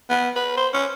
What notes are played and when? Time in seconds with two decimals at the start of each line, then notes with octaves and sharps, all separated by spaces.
0.10 B3
0.36 B4
0.57 C5
0.74 C#4